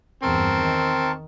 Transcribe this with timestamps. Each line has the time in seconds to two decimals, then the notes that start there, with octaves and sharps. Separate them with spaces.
0.23 E2 G2 C4 A#4 A5 C#6
0.59 D#3